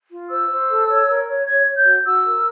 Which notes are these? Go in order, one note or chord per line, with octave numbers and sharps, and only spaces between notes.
F4
C5 E6
C5
A4
C#5
A#4
C#5
C#5 G#6
C#5
G6
F#4
F#4 E6
A#4